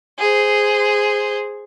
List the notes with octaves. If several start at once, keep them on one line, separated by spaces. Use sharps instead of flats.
G#4 C5